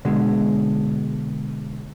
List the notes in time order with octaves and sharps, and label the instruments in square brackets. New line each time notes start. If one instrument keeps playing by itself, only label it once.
[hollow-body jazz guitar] B2 D3 G#3